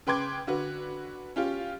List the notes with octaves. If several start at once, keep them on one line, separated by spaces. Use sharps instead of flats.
C#3 B4 G5 C6 D6 G#6
D3 F#4 B4
C#4 F4 G4